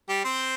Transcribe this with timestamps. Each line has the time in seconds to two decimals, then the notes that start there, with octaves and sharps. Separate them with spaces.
0.09 G3 G4
0.24 C4 C5